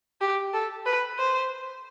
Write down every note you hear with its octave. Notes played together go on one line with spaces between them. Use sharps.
G4
A4
B4
C5